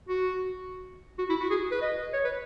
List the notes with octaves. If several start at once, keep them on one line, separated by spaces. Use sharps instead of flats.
F#4
F#4
E4
F#4
G#4
B4
D#5
C#5
B4